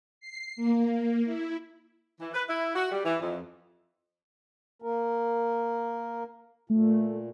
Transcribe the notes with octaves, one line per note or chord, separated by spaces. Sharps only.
C7
A#3
E4
E3
B4
E4
F#4
G3
E3
F2
A#3 A#4
A#2 A3